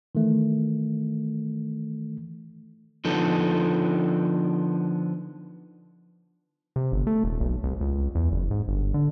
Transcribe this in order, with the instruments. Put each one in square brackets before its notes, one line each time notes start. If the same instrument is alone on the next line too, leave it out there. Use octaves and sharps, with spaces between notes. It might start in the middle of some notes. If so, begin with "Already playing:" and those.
[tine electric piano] D#3 E3 A3
[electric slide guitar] D3 F3 B3 D#4 A4
[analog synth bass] C3
G1
A3
D#1
B1
C2
C#2
E2
F#1
G#2
G1
D3